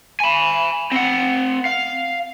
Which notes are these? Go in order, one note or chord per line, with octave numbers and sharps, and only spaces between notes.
G#5 B5
C4 F#5
F5